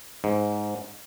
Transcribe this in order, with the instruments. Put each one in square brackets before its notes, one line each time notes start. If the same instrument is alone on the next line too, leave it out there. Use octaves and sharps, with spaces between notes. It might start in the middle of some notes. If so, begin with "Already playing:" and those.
[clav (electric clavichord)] G#2